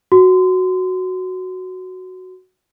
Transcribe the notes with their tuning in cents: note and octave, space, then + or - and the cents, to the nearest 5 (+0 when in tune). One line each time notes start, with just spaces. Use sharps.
F#4 +0 C6 -30